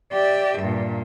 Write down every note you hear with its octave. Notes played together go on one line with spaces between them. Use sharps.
G4 D5 E5
G2 A#2